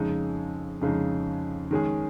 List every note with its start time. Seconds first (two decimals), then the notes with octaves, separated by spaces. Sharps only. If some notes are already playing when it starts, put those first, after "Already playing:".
Already playing: F2 C#3 G#3 D#4
0.81 F2 C#3 G#3 D#4
1.71 D#3 G#3 C#4 G#4